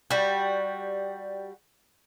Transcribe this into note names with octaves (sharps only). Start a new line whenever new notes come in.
G3 F#4